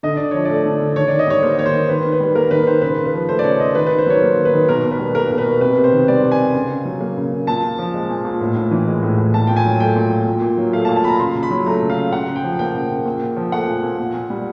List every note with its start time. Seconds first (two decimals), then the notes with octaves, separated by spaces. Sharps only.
0.03 D3 D#5
0.17 D3 D5
0.31 F3 C#5
0.45 A3 D5
0.65 D3
0.80 D3
0.96 D#3 C#5
1.08 D#3 D5
1.19 D#5
1.27 G3 C#5
1.43 A#3 C5
1.58 D#3 C#5
1.66 C5
1.74 D#3
1.89 D#3 B4
2.05 D#3
2.12 B4
2.20 G3
2.35 A#3 A#4
2.51 D#3 B4
2.66 D#3 C5
2.82 C#3 B4
2.98 C#3
3.05 B4
3.14 F3
3.29 A3 C5
3.39 D5
3.44 C#3 C#5
3.59 C#3 D#5
3.75 D#3 B4
3.86 D#3 B4
3.98 C5
4.06 F#3 C#5
4.22 A#3
4.37 D#3
4.45 B4
4.53 D#3
4.68 B2 A#4
4.84 B2
4.91 B4
4.99 G3
5.15 A#3 A#4
5.30 B2 A#4
5.38 B4
5.45 B2
5.61 C3 B4
5.77 C3
5.84 C5
5.92 D#3
6.08 G3 D5
6.23 C3
6.31 G#5
6.39 C3
6.54 C#3
6.70 C#3
6.85 F#3
7.01 A#3
7.17 C#3
7.32 C#3
7.47 A#2 A5
7.63 A#2
7.79 F3
7.94 G#3
8.09 A#2
8.25 A#2
8.41 A2
8.56 A2
8.71 E3
8.87 G#3
9.03 A2
9.18 A2
9.34 A#2 A5
9.47 A#2 G5
9.56 G#5
9.65 F#3
9.80 A3 G5
9.96 A#2
10.12 A#2
10.27 A#2
10.42 A#2
10.57 F#3
10.73 A3 F5
10.85 A5
10.89 A#2
10.96 A5
11.04 A#2 B5
11.08 A#5
11.20 C#3 C6
11.35 C#3
11.43 B5
11.50 F#3
11.66 A3 A#5
11.82 C#3
11.90 F5
11.97 C#3
12.12 C#3 F#5
12.28 C#3
12.36 G5
12.44 F3
12.59 A#3 G5
12.75 C#3
12.90 C#3
13.05 A#2
13.21 A#2
13.36 F3
13.52 A3 F#5
13.67 A#2
13.83 A#2
13.99 A#2
14.14 A#2
14.30 G3